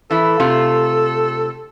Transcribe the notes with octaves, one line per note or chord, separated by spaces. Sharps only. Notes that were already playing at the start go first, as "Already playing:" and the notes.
E3 E4 A4
C3 A3 F4